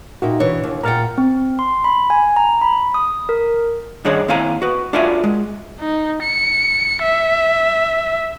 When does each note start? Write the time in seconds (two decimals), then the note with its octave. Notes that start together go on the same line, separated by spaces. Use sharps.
0.22 A#2 D#4 F#4 E5 G5
0.40 B2 E3 D4 C#5
0.63 D#2
0.83 A#2 F#5 G5 A#5 F6 A6
1.18 C4
1.59 C6
1.84 B5
2.10 G#5
2.36 A#5
2.61 B5
2.94 D#6
3.29 A#4
4.05 G2 D#3 D4 G#4 C#5 D#5
4.28 D#2 C4 E4 F5 G#5 A#5
4.62 F#4 B4
4.93 D4 F4 F#4 A#4 E5 G#5
5.24 G#3
5.80 D#4
6.22 C#7
7.02 E5